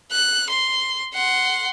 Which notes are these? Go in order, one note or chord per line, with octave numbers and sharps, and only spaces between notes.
F#6
C6
F#5 C6